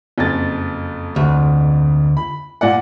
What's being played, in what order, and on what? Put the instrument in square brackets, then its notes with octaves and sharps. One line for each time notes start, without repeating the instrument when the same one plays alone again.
[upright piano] F#1 F2 A6
[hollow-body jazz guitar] D2
[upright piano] B5
A#2 D5 F#5